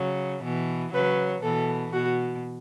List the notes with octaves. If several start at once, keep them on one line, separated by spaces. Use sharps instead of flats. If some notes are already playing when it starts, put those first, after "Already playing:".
Already playing: C#3 F#3
B2 E3
C#3 F#3 B4
B2 E3 A4
B2 F#4